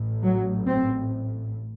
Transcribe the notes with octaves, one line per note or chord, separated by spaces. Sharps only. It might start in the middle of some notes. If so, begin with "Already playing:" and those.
Already playing: A1 A2
F#3
C4